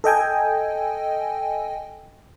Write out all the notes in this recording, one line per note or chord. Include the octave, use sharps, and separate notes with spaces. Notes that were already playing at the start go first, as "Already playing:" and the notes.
A4 D#5 G5 G#5